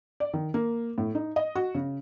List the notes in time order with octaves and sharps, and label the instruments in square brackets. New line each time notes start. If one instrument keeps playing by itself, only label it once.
[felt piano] D5
D#3
A#3
A2
D#4
D#5
F#4
C#3